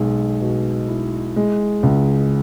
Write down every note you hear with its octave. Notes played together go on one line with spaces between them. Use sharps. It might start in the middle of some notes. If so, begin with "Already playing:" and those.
Already playing: B1 G#3
B2
E4
G#3
C#2